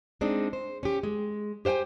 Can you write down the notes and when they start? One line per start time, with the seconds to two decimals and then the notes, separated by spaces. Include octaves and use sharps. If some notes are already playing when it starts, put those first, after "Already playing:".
0.21 G#3 C4 D4 D#4
0.53 C5
0.83 C#4 G4
1.03 G#3
1.65 G4 C5 F5 G5 G#5